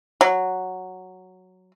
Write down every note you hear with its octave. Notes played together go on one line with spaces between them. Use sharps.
F#3